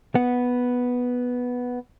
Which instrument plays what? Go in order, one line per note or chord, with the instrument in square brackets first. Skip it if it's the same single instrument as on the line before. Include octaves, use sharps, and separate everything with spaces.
[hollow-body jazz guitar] B3 F#5